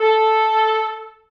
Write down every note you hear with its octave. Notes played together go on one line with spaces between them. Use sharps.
A4